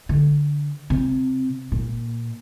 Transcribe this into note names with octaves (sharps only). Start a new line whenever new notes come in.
D3
C3
A#2